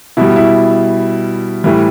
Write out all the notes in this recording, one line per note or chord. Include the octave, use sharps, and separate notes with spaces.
B2 G3 E4
E4
A2 E3 G3